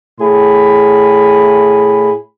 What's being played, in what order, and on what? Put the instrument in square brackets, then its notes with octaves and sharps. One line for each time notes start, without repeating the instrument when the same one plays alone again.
[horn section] A2 G#4 B5